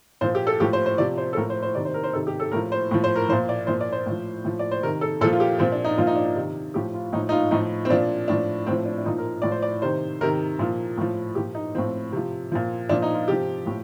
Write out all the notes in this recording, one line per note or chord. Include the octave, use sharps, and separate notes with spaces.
A#2 F3 C5
G4
A4
A2 F3 G4
C5
C5
C3 F3 D5
C5
A4
A2 F3 A#4
C5
C5
C3 D#3 D5
C5
A#4
C5
C3 D#3 A4
G4
A4
A2 F3 A#4
C5
A2 F3
C5
A#4
A#2 F3 C5
D5
A#2 F3 C5
D5
C5
A2 F3
A2 F3
D5
C5
C3 D#3 A#4
A4
A#2 F3 A4
F4
G4
A#2 F3 C4
D4
D#4
A#2 F3 F4
D#4
D4
D#4
C3 D#3
A2 F3 G4
F4
A2 F3 D#4
D#4
F4
A2 F3 D#4
C4
A#2 F3 D4
A2 F3 D4
A2 F3 C4
D4
D4
A#2 F3 D#4
A#4
A2 F3 D5
C5
D5
C3 D#3 C5
C3 D#3 A#4
A#2 F3
A2 F3
A#2 F3 G4
D#4
A2 F3 C4
C3 F3
A#2 F3
A#2 F3 D4
D#4
F4
C3 F3 G4
A2 F3